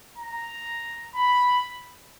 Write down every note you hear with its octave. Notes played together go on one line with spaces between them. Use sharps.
A#5
B5